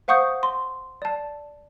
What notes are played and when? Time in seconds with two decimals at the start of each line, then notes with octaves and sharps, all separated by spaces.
0.08 C5 F5 F#5 C#6 D#6 G6
0.43 C6
1.02 D5 A5